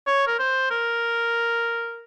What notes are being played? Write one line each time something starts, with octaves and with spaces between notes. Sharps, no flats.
C#5
A#4
C5
A#4